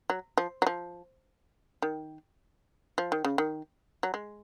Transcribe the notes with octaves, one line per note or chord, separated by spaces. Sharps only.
F#3
F3
F#3
F3
D#3
F3
D#3
C#3
D#3
F#3
G#3